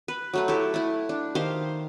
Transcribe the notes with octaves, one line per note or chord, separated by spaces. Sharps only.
B4
F#3 A3 B4
E4 G4 A4
A3 E4
D4
D#3 G4 C5 F5